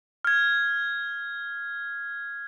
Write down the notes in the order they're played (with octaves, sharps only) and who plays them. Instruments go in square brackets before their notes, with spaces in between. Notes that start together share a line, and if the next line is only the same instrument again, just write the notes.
[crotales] F6 G#6